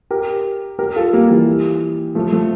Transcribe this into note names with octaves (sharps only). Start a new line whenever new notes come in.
G4 A#4
G4 A#4
F4 A4
G3 A#3
E3 G3
F3 A3
F3 A3